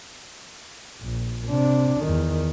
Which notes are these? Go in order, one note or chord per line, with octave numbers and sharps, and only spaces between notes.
A#1
C3 D4
E2 D#3